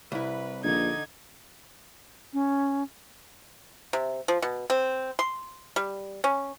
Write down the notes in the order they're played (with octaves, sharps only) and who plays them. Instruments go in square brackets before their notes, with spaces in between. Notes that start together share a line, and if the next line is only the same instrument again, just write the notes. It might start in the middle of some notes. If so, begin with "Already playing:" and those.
[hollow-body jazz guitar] C2 E4 [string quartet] B4
[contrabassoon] A#1 [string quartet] D3 D#4 G#6
[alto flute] C#4
[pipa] C3
F3
B2
C4
C6
G3
C#4